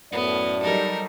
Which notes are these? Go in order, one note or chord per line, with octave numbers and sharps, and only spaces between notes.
F#2 A2 B3 D5
F#3 G3 D#4 A4 A#4